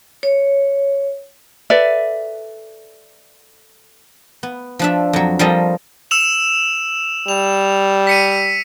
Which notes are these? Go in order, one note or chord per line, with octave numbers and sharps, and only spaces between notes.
C#5
A4 B4 D5 E5
B3
F3 D4 E5
F2 F#3
F3 G3 C4 A4 A#4 D#5
E6 E7 F7
G3 F7
B6 C#7 D#7